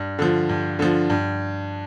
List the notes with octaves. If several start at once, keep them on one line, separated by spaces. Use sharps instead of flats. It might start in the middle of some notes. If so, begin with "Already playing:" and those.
Already playing: G2
D3 F3
G2
D3 F3
G2